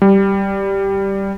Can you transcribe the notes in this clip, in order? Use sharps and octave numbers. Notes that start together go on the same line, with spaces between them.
G3